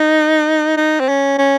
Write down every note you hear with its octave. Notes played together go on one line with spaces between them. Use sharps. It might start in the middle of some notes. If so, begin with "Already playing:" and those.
Already playing: D#4
D#4
C4
C#4
C#4